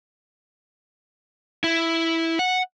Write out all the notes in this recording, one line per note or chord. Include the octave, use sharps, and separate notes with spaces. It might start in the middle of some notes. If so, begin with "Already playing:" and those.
E4
F#5